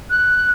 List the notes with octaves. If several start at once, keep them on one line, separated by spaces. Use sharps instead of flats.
F#6